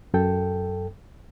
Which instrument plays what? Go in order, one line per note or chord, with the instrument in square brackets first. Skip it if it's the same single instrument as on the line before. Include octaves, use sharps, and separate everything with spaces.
[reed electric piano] F#2 A4 G5